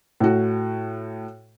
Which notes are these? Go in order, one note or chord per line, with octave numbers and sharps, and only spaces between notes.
A2 F#4